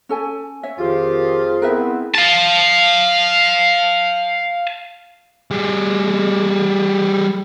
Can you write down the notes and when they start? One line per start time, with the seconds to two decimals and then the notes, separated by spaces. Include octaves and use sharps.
0.09 C#4 A4 G#5
0.63 C#5 E5 G#5
0.79 F2 D#3 F3 F4 G4 G#4
1.62 B3 C4 E4 A#4 B4 E5
2.15 F5 A5
5.51 G3 G#4